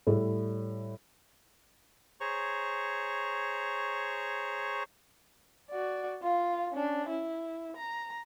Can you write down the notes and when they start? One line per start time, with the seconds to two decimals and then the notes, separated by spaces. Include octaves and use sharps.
0.07 A2 G3 A3
2.20 G#4 C5 C#5 A#5 C#6
5.71 F#4 D5
6.23 F4 F5
6.73 C#4 D4
7.09 E4
7.77 A#5